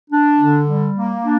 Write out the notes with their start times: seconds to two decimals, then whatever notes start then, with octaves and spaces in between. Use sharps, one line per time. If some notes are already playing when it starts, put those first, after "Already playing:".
0.10 D4
0.39 D3
0.67 G3
0.95 A#3
1.24 D4